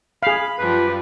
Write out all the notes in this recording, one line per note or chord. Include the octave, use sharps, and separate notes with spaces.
G#4 F5 B5
F#2 F3 G3 B4